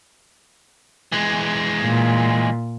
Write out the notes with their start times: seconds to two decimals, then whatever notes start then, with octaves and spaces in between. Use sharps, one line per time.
1.12 E3 G#3
1.83 A#2